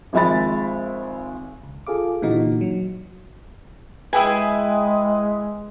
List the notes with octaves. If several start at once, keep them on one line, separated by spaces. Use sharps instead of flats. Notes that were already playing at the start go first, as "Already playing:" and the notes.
G#1 F3 G#3 E5 B5 A6
C#2
F4 G#4 A4 F5 D6
A#2 D3 E3 D#4 F#4
F#3
G#3 E4 G#4 B4 G5 G#5